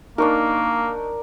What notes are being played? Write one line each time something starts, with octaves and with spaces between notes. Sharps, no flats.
A#3 D4 D#4 A#4 C#6